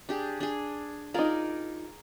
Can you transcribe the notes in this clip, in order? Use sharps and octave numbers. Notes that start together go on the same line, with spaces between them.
D4 G4 G#4
D4 G#4
D#4 F4 G#4 A#4 D5